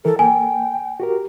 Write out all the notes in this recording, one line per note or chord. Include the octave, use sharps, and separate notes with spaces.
E3 A4 A#4
A#3 G5 G#5
F#4 G4 A#4